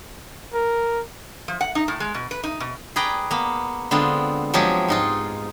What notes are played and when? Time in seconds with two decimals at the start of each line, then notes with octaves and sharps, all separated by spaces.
0.53 A#4
1.48 F3
1.61 F#5
1.75 D#4
1.88 A2
2.00 G#3
2.14 B2
2.31 B4
2.43 D#4
2.60 B2
2.96 G#4 B4 D5 G5 A#5
3.31 A#3 B3
3.91 D3 G#3 B3 C4 F4
4.54 F3 F#3 G#3 F4 G4 G#4
4.88 G#2 D#4 F4